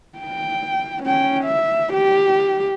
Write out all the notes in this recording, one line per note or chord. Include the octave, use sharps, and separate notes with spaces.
G5
C#4 G5
E5
G4